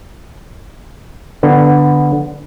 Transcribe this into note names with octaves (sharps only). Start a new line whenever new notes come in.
D3 B3